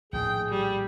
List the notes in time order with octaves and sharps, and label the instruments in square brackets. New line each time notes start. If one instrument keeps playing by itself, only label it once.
[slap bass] A#1 A2 D#3 [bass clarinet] G#4 [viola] G5
[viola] G3